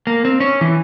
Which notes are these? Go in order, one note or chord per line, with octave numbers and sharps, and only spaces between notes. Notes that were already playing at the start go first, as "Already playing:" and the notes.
A#3
C4
C#4
E3